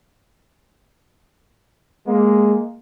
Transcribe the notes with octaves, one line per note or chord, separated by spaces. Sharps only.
G#3 A#3